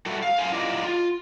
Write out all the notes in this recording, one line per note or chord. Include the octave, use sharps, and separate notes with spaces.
G3 A3 F#4 A4
F5
F#2 C5 F5 G#5
F#3 E4 F4 G4 D5 D#5
F4